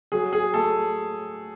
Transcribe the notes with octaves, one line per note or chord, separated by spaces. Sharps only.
F#3 G#4
G#4
A3 A4